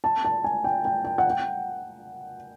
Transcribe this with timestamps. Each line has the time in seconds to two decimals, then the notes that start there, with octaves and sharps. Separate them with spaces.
0.04 A5
0.25 A5
0.44 G#5
0.64 G5
0.85 G5
1.05 G5
1.18 F#5
1.30 G5